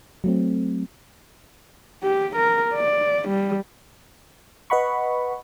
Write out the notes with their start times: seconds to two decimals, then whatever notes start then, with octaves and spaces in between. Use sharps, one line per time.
0.24 F#3 A3 C4
2.03 G4
2.36 A#4
2.74 D5
3.29 G3
4.70 B4 D#5 F#5 B5 C#6